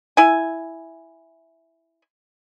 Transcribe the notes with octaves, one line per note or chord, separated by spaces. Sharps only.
E4 G#5